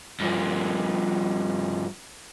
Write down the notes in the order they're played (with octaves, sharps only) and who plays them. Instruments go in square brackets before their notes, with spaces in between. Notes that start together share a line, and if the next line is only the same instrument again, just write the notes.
[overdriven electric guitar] G2 F3